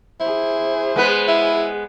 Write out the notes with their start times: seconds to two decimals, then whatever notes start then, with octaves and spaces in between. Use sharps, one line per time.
0.20 E4 G#4 C5
0.96 G#3 B3 B4
1.28 E4